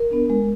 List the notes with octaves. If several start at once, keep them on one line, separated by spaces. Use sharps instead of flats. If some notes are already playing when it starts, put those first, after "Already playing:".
Already playing: A#4
B3 D4
G#3